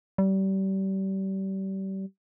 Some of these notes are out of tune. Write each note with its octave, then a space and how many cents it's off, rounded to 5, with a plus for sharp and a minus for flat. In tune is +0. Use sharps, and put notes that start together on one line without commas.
G3 -30